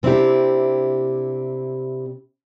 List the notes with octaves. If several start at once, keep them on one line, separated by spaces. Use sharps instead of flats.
C3 C4 D4 E4 G4